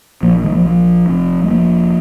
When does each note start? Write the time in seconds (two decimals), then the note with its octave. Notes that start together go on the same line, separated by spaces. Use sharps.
0.23 A#1 A#2 F3 A#3
0.44 D#3 G#3
0.55 F3 A#3
0.66 F3
1.08 F1 F2 C3
1.44 G#3
1.50 F3 A#3